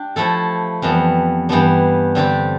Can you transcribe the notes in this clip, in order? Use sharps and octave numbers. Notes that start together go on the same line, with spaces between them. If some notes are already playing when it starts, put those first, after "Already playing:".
Already playing: D4 G4
F3 A3 E4 A4
F2 E3 G3 B3
G2 E3 G3 B3 D4
D3 G3 C4 G4